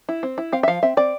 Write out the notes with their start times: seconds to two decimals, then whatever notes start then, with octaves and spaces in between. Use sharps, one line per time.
0.09 E4
0.23 C4
0.38 E4
0.52 C4 F5
0.63 E5
0.68 F3 F5
0.83 C4 E5
0.97 C4 D5